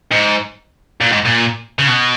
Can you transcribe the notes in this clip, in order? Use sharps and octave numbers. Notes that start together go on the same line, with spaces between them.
G#2
A#2
G#2
A#2
C#3
B2